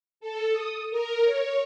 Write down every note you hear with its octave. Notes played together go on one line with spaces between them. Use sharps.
A4
D#6
A#4
C#5